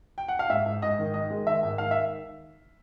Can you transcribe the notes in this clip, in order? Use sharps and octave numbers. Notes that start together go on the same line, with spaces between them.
G5
F#5
F5
G#2 E5
G#2
G#2 D#5
D#3
D#3 D#5
G#3
D#3 E5
G#2
D#3 F5
E5